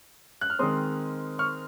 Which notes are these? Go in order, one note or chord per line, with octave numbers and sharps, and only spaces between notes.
F#6
F6
D#3 G#3 C4 C6 D#6
C#6 F6